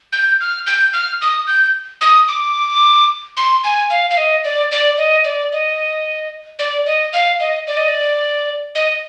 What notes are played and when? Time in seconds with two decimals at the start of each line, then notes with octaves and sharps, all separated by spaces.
0.13 G6
0.41 F6
0.66 G6
0.93 F6
1.21 D#6
1.47 G6
2.01 D#6
2.28 D6
3.37 C6
3.64 G#5
3.90 F5
4.10 F5
4.17 D#5
4.44 D5
4.72 D5
4.98 D#5
5.25 D5
5.52 D#5
6.59 D5
6.86 D#5
7.13 F5
7.40 D#5
7.67 D5
7.77 D#5
7.88 D5
8.75 D#5